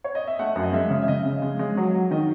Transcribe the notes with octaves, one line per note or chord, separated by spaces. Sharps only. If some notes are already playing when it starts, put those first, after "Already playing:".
C#5
D#5
E5
A3 F#5
F#2
D#5
G#3 E5
C#3
E5
C#3 D#5
C#3
G#3
G#3
F#3
F#3
D#3 D#5